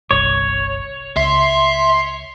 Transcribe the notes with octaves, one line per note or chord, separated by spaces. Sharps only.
G1 C2 C#5
C#2 E5 C6